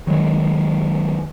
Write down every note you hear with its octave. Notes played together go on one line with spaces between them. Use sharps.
D#3 F#3 G#3